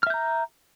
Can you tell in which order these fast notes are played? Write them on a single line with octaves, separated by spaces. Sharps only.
F6 E5 G6 A#5